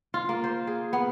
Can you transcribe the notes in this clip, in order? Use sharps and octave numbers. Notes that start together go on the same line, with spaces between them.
F4
A#3
C5
G#4
B3